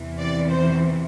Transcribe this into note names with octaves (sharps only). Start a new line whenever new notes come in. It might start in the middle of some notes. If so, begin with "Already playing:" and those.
Already playing: E2 C3 E3
D5
C5